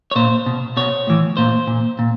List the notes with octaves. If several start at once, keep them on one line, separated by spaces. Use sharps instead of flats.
C#5
A#2 C5
B2
B2 C#5
A2 E3
A#2 C5
A#2
A#2